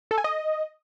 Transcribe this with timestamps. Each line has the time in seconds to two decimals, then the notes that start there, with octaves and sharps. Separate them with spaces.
0.11 A4
0.18 G#5
0.24 D#5